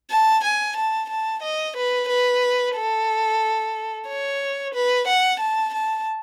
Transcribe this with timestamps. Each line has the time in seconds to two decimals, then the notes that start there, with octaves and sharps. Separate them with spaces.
0.11 A5
0.44 G#5
0.77 A5
1.09 A5
1.43 D#5
1.76 B4
2.09 B4
2.76 A4
4.08 C#5
4.74 B4
5.08 F#5
5.40 A5
5.74 A5